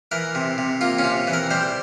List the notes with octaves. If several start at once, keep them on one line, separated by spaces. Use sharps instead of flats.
E3 A#4
C3
C3
A#3 F4
C#4
C3
E3
A#4
G3 C5